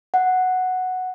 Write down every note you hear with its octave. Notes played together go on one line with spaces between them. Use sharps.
F#5